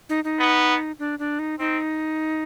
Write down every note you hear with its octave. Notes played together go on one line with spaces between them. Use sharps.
D#4
D#4
B3
D4
D4
D#4
C4 D#4